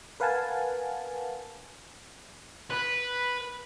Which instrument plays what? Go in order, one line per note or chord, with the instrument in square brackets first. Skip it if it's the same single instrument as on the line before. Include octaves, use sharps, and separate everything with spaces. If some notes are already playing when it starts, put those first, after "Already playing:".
[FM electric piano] A#4 B4 F5 F#5 G#5 A5
[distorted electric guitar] B4